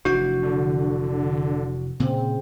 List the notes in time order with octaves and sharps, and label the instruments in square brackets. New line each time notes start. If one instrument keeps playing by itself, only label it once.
[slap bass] F1 E3 D4 [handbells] F#4
[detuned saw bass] D3
[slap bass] A#2 [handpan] C#3 C4